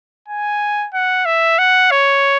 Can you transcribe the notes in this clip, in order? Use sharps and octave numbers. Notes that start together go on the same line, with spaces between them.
G#5
F#5
E5
F#5
C#5